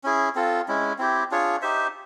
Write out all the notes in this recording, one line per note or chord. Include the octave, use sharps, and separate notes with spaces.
C#4 E4 G#4
C4 F4 A4
G#3 C#4 E4
C4 E4 G4
D4 F4 G#4 C#5
D#4 G4 C5 E5